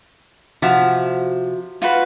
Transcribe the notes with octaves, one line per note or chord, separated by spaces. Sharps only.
C3 F3 F#4 E5
F4 F#4 B4